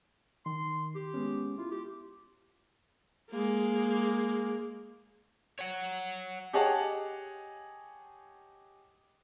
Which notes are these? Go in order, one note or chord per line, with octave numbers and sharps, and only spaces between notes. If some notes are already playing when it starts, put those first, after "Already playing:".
D#3 C6
G4
G#3 B3 C#4
E4 F4
G4
G#3 A#3
C#5 F#5
G4 G#4 C#5 D#5 F#5 A5